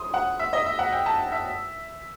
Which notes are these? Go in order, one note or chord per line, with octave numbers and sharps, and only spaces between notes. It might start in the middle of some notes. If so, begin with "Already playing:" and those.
Already playing: C6 D#6
F#5
E5
D#5
E5
F#5
G5
A5
E5